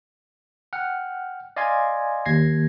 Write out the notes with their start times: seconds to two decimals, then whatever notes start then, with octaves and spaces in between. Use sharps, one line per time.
0.73 F#5 G5 F6 F#6
1.56 D5 D#5 F5 G#5 C6 G#6
2.26 D#2 G#6 A#6 C7